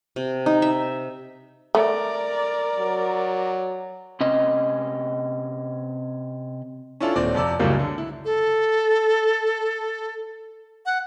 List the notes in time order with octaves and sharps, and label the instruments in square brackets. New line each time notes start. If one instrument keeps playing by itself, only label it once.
[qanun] C3
D#4
E5
[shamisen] A3 [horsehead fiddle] A#4 D5
[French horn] F#3
[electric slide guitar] C3 C#4 D#5
[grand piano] C#4 D4 E4 F4 A4
D#1 C4 D5 D6
F2 C3 D5 E6
C#2 F#2 A2 C#3 G3 A#3
D3
E4
[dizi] A4
F#5